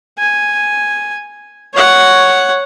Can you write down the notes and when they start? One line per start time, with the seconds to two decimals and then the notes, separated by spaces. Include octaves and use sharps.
0.18 G#5
1.74 C#5 F#5